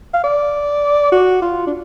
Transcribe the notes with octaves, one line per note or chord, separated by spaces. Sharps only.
F5
D5
F#4
F4
D4